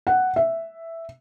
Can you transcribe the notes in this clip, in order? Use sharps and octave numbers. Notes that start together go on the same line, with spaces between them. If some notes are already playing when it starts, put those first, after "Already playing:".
F#5
E5